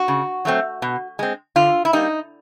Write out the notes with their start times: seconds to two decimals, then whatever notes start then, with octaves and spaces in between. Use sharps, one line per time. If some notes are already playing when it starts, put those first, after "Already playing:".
Already playing: F#4
0.08 C#3
0.45 F#3 A3 C4
0.82 B2
1.19 G#3 C4
1.56 D3 F4
1.85 E4
1.93 G3 A#3 D#4